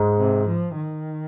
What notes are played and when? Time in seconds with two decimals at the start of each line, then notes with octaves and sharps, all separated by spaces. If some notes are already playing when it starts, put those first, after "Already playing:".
Already playing: G#2 G#3
0.19 C3
0.48 F3
0.76 D#3